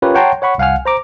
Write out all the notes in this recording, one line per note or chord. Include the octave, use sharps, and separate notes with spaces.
C#4 F4 G4 A#4 B4 C#5
C#5 F#5 G5 A5 A#5 C6
C#5 F#5 B5 C#6
C2 F5 F#5 G#5 F6
C5 A#5 D6